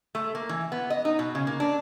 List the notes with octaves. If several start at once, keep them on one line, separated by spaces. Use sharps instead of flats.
A3
A#3
E3
B3
D#5
D#4
B2
C#3
A#3
D4